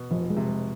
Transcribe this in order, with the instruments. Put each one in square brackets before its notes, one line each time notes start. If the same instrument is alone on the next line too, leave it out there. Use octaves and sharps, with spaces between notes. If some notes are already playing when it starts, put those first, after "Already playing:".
Already playing: [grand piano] B2
[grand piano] F1 [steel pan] F3
[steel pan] G#3
[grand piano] C3
[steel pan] G#3